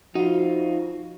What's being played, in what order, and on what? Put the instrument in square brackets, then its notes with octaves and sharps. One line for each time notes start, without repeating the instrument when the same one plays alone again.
[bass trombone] F3 [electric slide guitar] D#4 F4 [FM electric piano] F#4